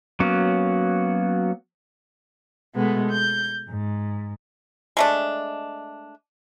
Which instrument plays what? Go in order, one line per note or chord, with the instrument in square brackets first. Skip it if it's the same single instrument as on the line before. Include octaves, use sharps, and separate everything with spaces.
[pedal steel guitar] F#3 A#3 B3 C#4 F#4
[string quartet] B2 G#3 A3 B3
G6
G#2
[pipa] G#3 A3 D4